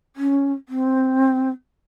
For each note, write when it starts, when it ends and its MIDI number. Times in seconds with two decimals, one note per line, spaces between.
0.16 0.51 61
0.68 1.49 60